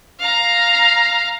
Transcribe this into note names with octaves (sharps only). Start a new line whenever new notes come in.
F5 A#5